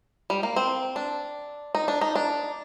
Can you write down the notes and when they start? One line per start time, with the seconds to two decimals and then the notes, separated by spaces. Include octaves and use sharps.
0.30 G3
0.43 A#3
0.56 C4
0.96 D4
1.75 D#4
1.88 D4
2.01 D#4
2.16 D4